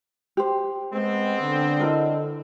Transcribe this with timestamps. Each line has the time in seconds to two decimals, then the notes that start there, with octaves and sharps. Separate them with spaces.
0.37 G4 C5
0.93 G#3 B3 C4
1.41 D3
1.79 E4 A#4 D#5